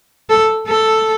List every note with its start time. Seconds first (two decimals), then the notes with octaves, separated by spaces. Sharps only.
0.30 A4
0.67 A4